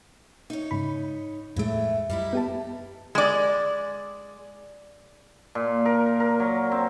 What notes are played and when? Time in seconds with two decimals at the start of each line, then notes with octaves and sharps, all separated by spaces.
0.50 D#4 C#5
0.71 G#2 C#3 B5
1.56 F2 A2 E3 G#3 A3
2.10 F#2 G3 D#4 E4
2.33 B3 G4 A5
3.15 G#3 D5
5.55 A#2
5.86 A#4
6.20 A#4
6.40 F#3
6.72 C4